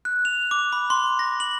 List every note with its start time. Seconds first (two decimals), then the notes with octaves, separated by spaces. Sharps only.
0.05 F#6
0.25 F7
0.51 D6
0.73 B5
0.90 C6
1.19 A#6
1.40 F#7